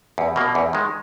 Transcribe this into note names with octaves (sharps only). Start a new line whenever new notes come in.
E2
B2 A#3
E2
D#3 G#3